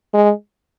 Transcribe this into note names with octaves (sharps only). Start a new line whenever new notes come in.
G#3